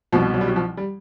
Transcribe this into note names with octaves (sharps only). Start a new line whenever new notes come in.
C2 B2 F3
F#3
G3
F#3
F3
G3